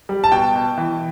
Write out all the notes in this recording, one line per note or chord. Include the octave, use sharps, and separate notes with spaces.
G3
A5
B2 G5
B2
E3